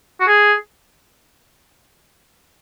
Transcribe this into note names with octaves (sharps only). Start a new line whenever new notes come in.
F#4
G#4